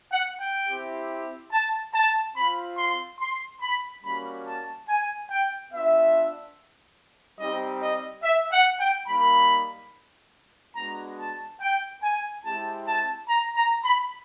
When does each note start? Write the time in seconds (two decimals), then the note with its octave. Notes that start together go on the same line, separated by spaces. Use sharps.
0.12 F#5
0.41 G5
0.68 C4 E4 G4
1.52 A5
1.94 A5
2.36 C4 F4 B5
2.78 C6
3.20 C6
3.62 B5
4.04 G3 A#3 C#4 F#4 B5
4.47 A5
4.89 G#5
5.30 G5
5.72 B3 D4 F4 E5
7.40 G3 C4 D#4 G4 D#5
7.83 D#5
8.24 E5
8.53 F#5
8.80 G5
9.08 G3 A#3 D#4 B5
10.76 G#3 B3 D4 F#4 A#5
11.19 A5
11.61 G5
12.03 G#5
12.44 G#3 C4 E4 G4 A5
12.87 A5
13.29 A#5
13.56 A#5
13.84 B5